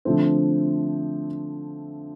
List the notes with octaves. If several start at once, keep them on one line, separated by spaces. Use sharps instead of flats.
D3 F3 A3 C4